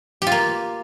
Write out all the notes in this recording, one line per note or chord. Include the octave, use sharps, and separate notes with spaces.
A#3 F4 G4